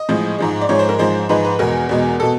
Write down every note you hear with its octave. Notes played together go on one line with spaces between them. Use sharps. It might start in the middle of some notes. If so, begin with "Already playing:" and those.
Already playing: D#5
A2 F3 G#3
G#2 F3 G#3
D5
G#2 F3 G#3 C#5
C5
A#4
G#2 F3 G#3 C5
G#2 F3 G#3 B4
B4
E2 B2 G#3 A#4
E2 B2 G#3
B2 A4